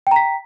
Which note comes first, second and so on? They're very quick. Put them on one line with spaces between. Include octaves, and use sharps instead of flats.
G5 A#5 B6